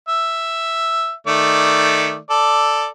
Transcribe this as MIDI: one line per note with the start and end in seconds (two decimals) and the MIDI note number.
0.08 1.13 76
1.27 2.18 51
1.27 2.18 57
1.27 2.18 74
2.30 2.87 69
2.30 2.87 74